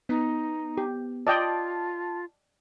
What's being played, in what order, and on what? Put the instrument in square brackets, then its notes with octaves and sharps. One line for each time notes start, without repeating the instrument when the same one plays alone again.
[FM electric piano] B3 [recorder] D#4
[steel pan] G4
[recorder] F4 [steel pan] D5 D#5 G5 [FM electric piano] A5